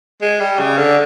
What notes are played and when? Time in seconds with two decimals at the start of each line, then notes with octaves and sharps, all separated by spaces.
0.21 G#3
0.40 G3
0.59 C#3
0.77 D3